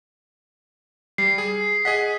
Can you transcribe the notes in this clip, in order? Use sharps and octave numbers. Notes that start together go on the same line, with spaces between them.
G3 C7
G#4
G#4 D#5 F#5 B6